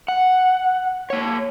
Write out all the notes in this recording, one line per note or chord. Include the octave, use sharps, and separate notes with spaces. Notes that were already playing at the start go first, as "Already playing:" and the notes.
F#5
A#3 C#5